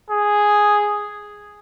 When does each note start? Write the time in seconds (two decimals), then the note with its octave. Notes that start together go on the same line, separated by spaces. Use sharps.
0.11 G#4